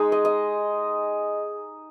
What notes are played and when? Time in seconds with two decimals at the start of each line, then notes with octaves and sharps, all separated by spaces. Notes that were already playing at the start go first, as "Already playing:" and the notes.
Already playing: G#3 D#4 G#4
0.12 D#5
0.25 D#5